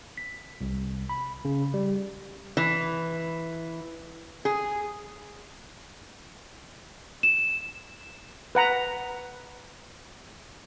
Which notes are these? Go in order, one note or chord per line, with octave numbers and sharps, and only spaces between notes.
B6
C2
B5
C#3
G3
E3
G#4
E7
B4 F#5 A#5